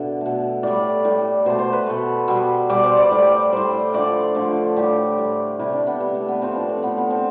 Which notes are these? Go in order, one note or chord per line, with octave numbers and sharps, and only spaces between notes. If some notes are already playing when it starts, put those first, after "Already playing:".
Already playing: B2 D3 D5 E5
B2 A3
A2 G3 D5
A2 G3
B2 A3 C5
C5
B4
B2 A3
B2 G3
B2 G3 D5
C5
D5
A2 G3
A2 G3 C5
D3 F3 A3 D5
D3 F3 A3
A2 G3 G4
A2 G3
C3 G3 E4
D4
B3
C3 G3 B3
A3
B3
A2 F3 A3 C4
D4
C4
A2 F3 A3 B3
B3
C4